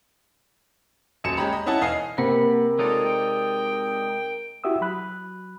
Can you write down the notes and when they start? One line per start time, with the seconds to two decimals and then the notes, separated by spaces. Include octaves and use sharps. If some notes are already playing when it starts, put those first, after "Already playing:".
1.24 D#1 F#2 C#7 E7
1.37 G#3 C#4 G4 A#5 B5
1.53 D#5
1.66 C#4 E4 D#5 F#5 A5
1.81 E1 D#5 F5 G#5 C7
2.18 C3 A#3 A#4 B4 F#5
2.79 G#3 D#4 F4 A4 C#5 D5
3.05 G5
4.64 E4 F#4 G4 E5 D#6 E6
4.81 F#3 B5 F#6